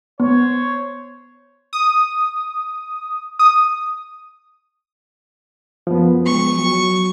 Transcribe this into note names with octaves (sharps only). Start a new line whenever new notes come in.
B3 C5 C#5
D#6
D#6
F#1 F3 B3
G#3 C#6
F#3